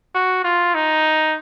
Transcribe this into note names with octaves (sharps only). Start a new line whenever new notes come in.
F#4
F4
D#4